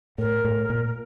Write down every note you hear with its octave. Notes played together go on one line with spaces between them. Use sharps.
A2 A#4
A2
A#2